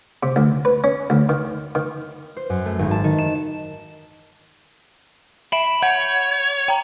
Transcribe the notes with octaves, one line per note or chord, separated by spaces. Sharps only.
C3
D2
B4
C#4
D2
D#3
D#3
C5
F#2
A3
G#1
A5
D#3
E7
E5 B5 D7 E7
C#5 F#5 G6
G5 A#5